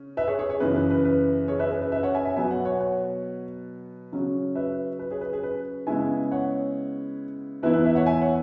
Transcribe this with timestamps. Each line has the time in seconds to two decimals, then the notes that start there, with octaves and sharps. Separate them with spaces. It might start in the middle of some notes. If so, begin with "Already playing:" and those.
Already playing: C#3 C#4
0.17 B4 E5
0.27 G#4 C#5
0.39 G#4 C#5
0.49 G#4 C#5
0.60 F#2 C#3 E3 B4
0.76 B4
0.90 B4
1.05 B4
1.48 G#4 C#5
1.59 B4 E5
1.67 G#4
1.70 B4
1.82 B4
1.92 B4 E5
2.03 C#5 F#5
2.14 E5 G#5
2.25 E5 G#5
2.37 B2 F#3 B3 E5 G#5
2.51 C#5 F#5
2.65 C#5 F#5
2.80 C#5 F#5
4.12 C#3 F#3 C#4
4.55 B4 E5
4.99 B4
5.11 G#4 C#5
5.21 B4
5.33 G#4
5.43 B4
5.87 C#3 G#3 B3 E4 E5 G#5
6.31 C#5 F#5
7.63 E2 E3 B3 E4 B4 E5
7.73 B4
7.85 B4 E5
7.95 C#5 F#5
8.06 E5 G#5
8.21 C#5 F#5